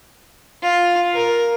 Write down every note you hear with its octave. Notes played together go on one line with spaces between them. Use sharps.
F4
A#4